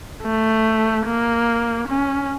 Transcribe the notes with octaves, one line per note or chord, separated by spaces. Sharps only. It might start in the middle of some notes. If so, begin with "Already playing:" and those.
A3
A#3
C#4